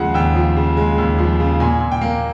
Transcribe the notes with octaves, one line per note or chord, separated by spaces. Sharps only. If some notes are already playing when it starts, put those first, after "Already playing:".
Already playing: D#2 C#3 F3 G#3 F5 F#5
D#2 G5
F3
C#3
G#3
D#2
F3
C#3
A#2 G#5
A#2
G5
A#3